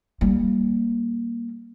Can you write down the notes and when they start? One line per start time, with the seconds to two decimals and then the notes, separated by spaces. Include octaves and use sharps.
0.21 G3 A#3